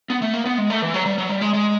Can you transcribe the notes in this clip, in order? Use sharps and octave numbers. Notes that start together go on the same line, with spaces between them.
B3
A3
A#3
B3
G#3
A3
E3
F#3
G3
F#3
G3
G#3
G#3